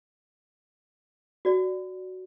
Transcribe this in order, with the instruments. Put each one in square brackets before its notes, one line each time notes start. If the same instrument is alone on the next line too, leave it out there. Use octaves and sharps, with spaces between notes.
[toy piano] F#4 D5